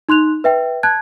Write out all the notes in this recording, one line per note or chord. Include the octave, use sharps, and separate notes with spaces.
D#4 C6 F#6 F7
B4 E5 G5
A5 F#6 G#6